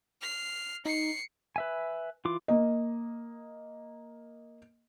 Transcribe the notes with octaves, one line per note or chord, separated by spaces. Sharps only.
F6 C7
D#4 C7 C#7
B4 E5 G#5
E3 F4 D6
A#3 D#5